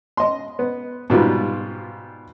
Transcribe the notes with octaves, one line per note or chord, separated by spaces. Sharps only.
D#5 C6
B3
G#2 B2 G3 F4